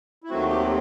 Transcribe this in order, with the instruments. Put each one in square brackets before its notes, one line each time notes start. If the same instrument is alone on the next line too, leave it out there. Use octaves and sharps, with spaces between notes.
[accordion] E4
D#2 D#3 F#3 A3 C4 F#4
G4